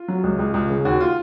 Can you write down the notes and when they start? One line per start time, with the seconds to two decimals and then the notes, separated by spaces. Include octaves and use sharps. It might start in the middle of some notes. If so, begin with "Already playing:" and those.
Already playing: F4
0.08 F#3
0.24 C#2
0.39 C#2
0.54 C#2
0.70 C#3
0.85 D#2 F#4
1.01 F4